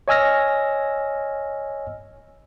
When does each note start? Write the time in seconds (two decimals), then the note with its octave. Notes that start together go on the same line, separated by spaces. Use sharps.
0.08 C#5 D#5 G#5 E6 F6 A#6